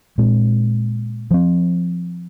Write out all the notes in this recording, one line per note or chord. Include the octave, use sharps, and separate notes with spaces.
A#2 G#3 C4
F3 C4